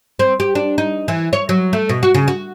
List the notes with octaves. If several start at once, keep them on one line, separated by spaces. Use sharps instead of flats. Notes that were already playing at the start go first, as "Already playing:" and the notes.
C4
G4
D4
D#4
E3
C#5
F#3
A3
B2
F#4
C#3
F#4